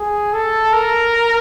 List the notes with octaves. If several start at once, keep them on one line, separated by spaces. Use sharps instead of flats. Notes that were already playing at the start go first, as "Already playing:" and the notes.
Already playing: G#4
A4
A#4